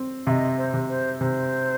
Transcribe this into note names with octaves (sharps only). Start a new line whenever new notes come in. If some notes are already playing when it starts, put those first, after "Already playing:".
Already playing: C4
C3 D#5 F5
C5
C3
C5
C3 C5